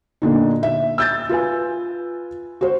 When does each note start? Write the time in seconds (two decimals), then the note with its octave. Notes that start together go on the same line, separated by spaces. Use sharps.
0.22 A#2 D3 D#4
0.63 E5
0.98 E6 G6 A6
1.29 F4 B4 G#5
2.61 F#4 C5